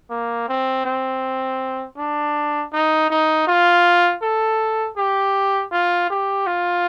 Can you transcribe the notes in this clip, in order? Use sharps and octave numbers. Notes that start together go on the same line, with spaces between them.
A#3
C4
C4
D4
D#4
D#4
F4
A4
G4
F4
G4
F4